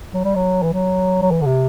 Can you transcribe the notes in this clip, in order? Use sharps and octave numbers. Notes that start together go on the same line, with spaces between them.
F#3
G3
F#3
E3
F#3
F#3
E3
D3
C3